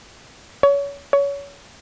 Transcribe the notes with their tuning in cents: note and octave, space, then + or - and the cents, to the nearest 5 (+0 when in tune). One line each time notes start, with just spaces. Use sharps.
C#5 +30
C#5 +25